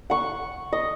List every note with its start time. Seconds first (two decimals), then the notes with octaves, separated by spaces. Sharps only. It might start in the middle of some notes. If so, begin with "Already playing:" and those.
0.10 F#5 C#6
0.73 D#5